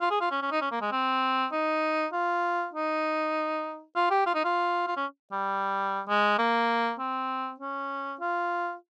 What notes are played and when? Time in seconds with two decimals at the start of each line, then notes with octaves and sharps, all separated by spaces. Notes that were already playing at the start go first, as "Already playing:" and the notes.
0.01 F4
0.11 G#4
0.21 F4
0.31 C#4
0.42 C#4
0.51 D#4
0.61 C#4
0.71 A#3
0.81 G#3
0.92 C4
1.52 D#4
2.13 F4
2.74 D#4
3.96 F4
4.11 G4
4.26 F4
4.35 D#4
4.45 F4
4.87 F4
4.97 C#4
5.32 G3
6.08 G#3
6.39 A#3
6.99 C4
7.60 C#4
8.20 F4